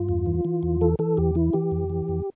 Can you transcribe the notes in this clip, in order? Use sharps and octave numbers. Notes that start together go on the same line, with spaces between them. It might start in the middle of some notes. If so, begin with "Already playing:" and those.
Already playing: G2 F4
E2
E3
E3
E2
E3 A4
E3 A4
E2 G4
E3 E4
E3 G4
F2
E3
F2